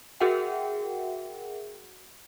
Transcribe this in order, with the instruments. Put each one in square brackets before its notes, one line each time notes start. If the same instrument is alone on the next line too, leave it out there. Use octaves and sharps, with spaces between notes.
[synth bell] F#4 G#4 A#4 E5 F#5 G5